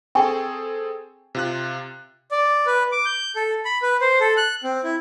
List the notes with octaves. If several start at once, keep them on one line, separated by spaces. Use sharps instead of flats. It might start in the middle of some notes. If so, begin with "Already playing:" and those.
C4 G#4 A4 G5 G#5 C#6
C3 F4 F#6
D5
B4
D6
G6
A4
B5
B4
C5
A4
F#6
C4
E4